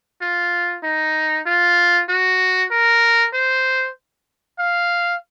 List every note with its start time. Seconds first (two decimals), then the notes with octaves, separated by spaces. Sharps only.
0.22 F4
0.83 D#4
1.46 F4
2.09 F#4
2.71 A#4
3.34 C5
4.59 F5